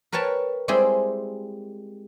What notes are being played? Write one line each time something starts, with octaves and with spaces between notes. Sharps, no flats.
A#4 B4 C#5 G5 A5
G3 G#3 C4 E4 G4 G#4